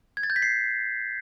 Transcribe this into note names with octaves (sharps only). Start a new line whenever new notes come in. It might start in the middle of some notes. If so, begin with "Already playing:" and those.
G#6
A6
G6
B6
C7